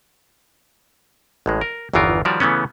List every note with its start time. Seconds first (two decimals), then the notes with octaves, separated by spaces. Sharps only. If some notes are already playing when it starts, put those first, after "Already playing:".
1.46 A1 A2 G#3
1.61 A#4
1.93 G1 E2 D#3 E3 F4 A#4
2.25 D#3 F3 G3 F#4 C#5 D5
2.40 C#3 E3 A3 B3 C#4